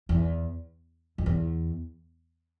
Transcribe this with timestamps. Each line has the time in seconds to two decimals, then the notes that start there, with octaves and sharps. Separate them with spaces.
0.09 E2
1.18 F2
1.26 E2